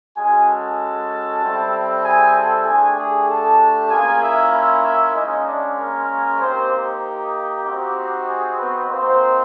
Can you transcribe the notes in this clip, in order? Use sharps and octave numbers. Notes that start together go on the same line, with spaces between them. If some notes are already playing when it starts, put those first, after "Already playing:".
G#3 C#4 F#4 G#4 G#5
A4 A5
G3 C4 E4
G#4 G#5
A4 A5
A3 D4 G4 G#4 G#5
G#4 G#5
A4 A5
A#3 C#4 F4 G#4 G#5
E4 E5
E4 E5
E4 E5
G#3 C#4 D#4 F4 D#5
D4 D5
A#3 A#4
A#3 C4 D#4 G4 C5
G4
C4 D#4 F#4
G#4
B3 B4
A#3 C4 D#4 F#4 C5